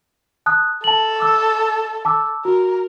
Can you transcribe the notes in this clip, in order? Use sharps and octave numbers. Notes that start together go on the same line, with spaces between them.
A5 D#6 F#6
A4 A5 F#7
D6 E6
A5 D6 E6
F#4 A#4